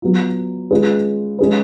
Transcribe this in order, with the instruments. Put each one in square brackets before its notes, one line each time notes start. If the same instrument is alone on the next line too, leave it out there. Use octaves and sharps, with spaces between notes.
[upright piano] F#3 B3 F4
G#3 C#4 F4 G#4 B4
G#3 C#4 G#4 B4